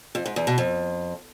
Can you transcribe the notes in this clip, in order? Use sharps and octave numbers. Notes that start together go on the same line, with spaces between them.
F2
G#2
E2
B2
F2